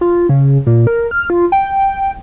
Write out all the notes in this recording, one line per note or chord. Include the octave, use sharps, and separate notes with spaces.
F4
C#3
A#2
A#4
F6
F4
G5